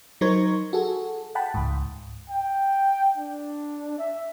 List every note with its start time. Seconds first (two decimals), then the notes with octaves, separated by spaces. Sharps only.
0.21 F#3 D#4 A#4 C5 C#6 G#6
0.73 F#4 G#4 A4
1.35 F#5 G5 A5 B5
1.54 C#2 G#2
2.30 G5
3.17 D4
3.99 E5